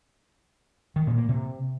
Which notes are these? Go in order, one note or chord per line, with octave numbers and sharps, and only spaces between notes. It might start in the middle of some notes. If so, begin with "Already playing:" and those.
D#3
A#2
A#3
C3